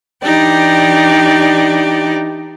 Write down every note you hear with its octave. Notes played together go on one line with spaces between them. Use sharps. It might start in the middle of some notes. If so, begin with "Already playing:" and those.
E3 D4 D#4 G4 D5